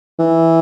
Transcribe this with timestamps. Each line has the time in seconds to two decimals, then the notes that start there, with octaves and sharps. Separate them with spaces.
0.19 E3